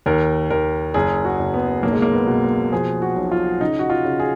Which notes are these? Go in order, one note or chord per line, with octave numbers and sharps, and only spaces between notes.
D#2 A#4
D#2 A#4
F#1 G#4
F#4
F#1
B3
B1 A#3
G#3
A#3
B3
B2
F3 G#4
F#4
B1
F4
C#3 D#4
F#4
F4
C#3
G#4